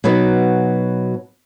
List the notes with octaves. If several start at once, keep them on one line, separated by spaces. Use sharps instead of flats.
B2 F#3 B3 D#4